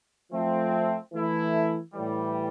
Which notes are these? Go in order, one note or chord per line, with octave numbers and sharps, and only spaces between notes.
F3 A3 C4
E3 A3 E4
A2 E3 G3